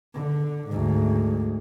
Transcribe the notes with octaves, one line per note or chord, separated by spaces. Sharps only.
D3
D2 G#2